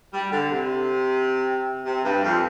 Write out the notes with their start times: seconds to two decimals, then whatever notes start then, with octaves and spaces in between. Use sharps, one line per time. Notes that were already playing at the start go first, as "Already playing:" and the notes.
0.12 G3
0.30 D3
0.50 C3
1.85 C3
2.04 G2
2.23 F2